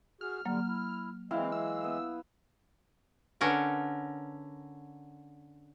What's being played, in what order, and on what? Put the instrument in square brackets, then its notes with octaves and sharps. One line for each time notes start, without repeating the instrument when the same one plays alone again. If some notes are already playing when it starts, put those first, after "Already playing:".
[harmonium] F#4 G#4 [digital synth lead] F6
[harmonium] D3 G3 [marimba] F#3 A#3
[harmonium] E4
[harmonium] E3 G#3 [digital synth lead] C4 [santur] E4 F5
[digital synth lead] E6
[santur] B3
[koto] D3 C#4 A#4 B4